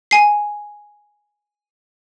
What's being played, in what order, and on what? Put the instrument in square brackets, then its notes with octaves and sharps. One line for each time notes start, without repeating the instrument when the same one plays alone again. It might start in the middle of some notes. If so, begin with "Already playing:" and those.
[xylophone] G#5 C7